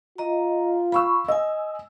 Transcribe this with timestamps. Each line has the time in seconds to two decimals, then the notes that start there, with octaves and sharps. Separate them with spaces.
0.18 F4 D#5 A#5
0.92 F5 B5 C#6 E6
1.28 D#5 G#5 E6